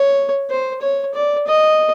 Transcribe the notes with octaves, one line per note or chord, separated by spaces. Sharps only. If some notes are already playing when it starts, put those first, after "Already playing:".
Already playing: C#5
C5
C#5
D5
D#5